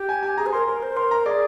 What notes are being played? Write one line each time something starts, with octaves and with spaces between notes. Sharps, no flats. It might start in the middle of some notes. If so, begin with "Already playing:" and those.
Already playing: G4
G#5
G#5
G#4 A#5
C5
A#4 C6
A#4
C5
A#4 C6
A#5
G#4 D5